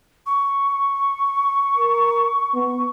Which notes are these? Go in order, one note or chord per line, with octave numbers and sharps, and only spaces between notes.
C#6
A#4
B3